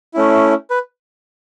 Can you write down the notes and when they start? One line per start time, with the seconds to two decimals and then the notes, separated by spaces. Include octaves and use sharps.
0.14 A3 C#4 E4
0.70 B4